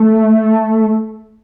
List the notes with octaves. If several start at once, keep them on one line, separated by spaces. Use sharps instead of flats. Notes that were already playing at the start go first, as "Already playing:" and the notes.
Already playing: A3